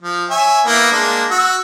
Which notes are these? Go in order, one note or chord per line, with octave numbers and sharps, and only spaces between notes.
F3
C#5 E5 G#5
A#3 B3 E4
G#3 A#3 D4
F#4 E6